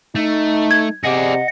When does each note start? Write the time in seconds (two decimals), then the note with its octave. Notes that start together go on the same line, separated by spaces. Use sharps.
0.15 A3 D#4
0.71 G#6
1.04 C3 G#4 D5 D#5 F#5